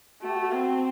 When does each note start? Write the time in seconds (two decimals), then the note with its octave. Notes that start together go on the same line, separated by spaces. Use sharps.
0.22 A3 F#4
0.29 G4
0.36 F#4
0.53 C4